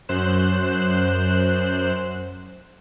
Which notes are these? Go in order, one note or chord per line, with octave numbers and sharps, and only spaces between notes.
F#2 C5 F#6 E7